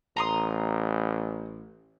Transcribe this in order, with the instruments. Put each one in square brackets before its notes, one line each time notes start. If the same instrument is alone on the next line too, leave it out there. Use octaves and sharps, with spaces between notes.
[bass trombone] A1 [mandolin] A#5 C6 D#6